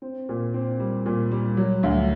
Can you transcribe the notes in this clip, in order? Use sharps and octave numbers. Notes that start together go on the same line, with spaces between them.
C4
A#2
C4
G3
A#2
G3
F#3
D2